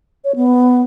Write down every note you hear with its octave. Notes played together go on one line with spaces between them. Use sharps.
C#5
B3